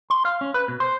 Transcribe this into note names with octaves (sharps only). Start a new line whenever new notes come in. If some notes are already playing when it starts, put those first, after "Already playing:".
C6
F5
C#4
B4
B2
C5